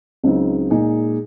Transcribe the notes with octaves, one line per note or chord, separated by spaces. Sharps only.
C#2 C#3 F#3 C4 D#4
A#2 G#3 D#4 G#4